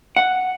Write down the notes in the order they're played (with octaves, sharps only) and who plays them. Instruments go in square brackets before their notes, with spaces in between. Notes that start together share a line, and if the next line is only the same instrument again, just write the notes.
[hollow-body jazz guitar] F#5